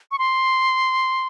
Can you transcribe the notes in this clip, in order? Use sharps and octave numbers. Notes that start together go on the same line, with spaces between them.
C#6
C6